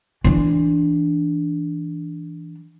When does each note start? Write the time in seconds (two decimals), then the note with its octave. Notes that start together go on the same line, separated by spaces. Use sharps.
0.24 E3 D4